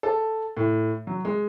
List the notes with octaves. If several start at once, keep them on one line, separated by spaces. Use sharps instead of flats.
A4
A2
F#3
G#3